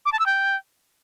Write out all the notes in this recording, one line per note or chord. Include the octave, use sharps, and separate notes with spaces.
D6
A5
E6
G5